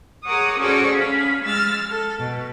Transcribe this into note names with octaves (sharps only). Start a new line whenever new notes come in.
G#4 A#4 C#5 F#5 D6 D#6
C#4 F#4 G#4 A4 C5 D5
C#4 F5 B5
G#3 E6 F6 A6 A#6
A4
B2